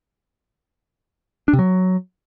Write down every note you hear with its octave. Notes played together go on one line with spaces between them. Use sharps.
D4
C3
F#3